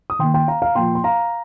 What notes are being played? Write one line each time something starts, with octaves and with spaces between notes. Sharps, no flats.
D#6
D#3 A#3 G5 C6
G5 C6
F5 A#5
F5 A#5
A#2 F3 A#3 G5 C6
C6
F5 A#5